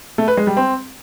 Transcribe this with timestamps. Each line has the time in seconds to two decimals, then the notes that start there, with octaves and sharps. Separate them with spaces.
0.18 A3
0.28 B4
0.37 G#3
0.47 G3
0.57 C4